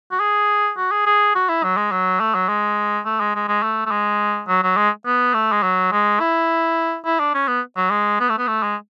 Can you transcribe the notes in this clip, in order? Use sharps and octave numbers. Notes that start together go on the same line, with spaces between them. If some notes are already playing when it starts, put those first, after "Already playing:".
F#4
G#4
F#4
G#4
G#4
F#4
E4
F#3
G#3
F#3
A3
F#3
G#3
A3
G#3
G#3
G#3
A3
A3
G#3
F#3
F#3
G#3
B3
A3
G#3
F#3
G#3
E4
E4
D4
C#4
B3
F#3
G#3
B3
A3
B3
A3
G#3